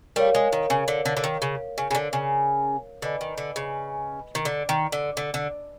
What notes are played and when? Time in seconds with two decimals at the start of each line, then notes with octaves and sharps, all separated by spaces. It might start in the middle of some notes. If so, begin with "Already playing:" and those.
0.16 G3 A3 A#4 C#5 F5
0.35 G#3
0.52 D#3
0.70 C#3
0.88 D3
1.05 D3
1.17 D3
1.24 D#3
1.42 C#3
1.78 C#3
1.91 C#3
1.95 D3
2.13 C#3
3.02 D3 B4 D#5 G#5 B5
3.21 D#3
3.38 D3
3.56 C#3
4.35 D#3
4.45 D3
4.69 D#3
4.92 D3
5.17 D3
5.34 D3